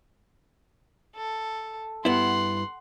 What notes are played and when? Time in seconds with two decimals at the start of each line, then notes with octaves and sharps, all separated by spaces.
1.16 A4
2.05 G2 B3 E4 F#5 C6